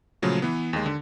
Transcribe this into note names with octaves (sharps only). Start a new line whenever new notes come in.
A#2 C#3 F3 F#3 A3
E3 B3
D#2 G#3
D3